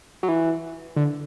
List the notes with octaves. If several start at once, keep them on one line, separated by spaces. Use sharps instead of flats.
F#3
E3
D3